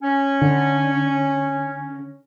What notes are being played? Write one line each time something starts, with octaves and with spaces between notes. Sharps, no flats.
C#4
D3